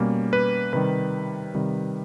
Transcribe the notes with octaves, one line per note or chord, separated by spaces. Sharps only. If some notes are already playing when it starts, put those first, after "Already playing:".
Already playing: B2 G3 A#3 C#4
B4
C3 D#3 G3 B4
C3 D#3 G3